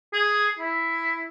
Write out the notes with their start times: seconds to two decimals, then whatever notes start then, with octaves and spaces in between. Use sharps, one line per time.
0.13 G#4
0.59 E4